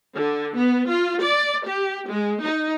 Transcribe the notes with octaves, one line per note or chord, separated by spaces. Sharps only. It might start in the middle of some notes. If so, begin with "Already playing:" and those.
D3
B3
F4
D5
G4
G#3
D#4